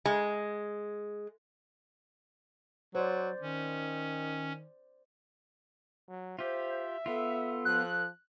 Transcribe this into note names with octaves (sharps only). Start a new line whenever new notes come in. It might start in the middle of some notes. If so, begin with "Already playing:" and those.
G#3
F#3 C5 D5
D#3 C#4
F#3
F4 G4 C5 E5
B3 F4 A4
F3 F#6